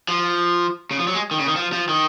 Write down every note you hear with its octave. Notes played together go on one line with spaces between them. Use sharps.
F3
C#3
F3
F#3
G#3
D#3
C#3
D#3
F3
F3
D#3